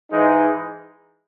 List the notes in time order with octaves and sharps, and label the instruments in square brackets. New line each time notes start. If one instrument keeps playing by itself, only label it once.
[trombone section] G#2 E3 G#3 D#4